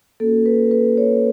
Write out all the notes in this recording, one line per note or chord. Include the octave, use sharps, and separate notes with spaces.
A#3 C#4 F#4 A4
B4
B4
C#5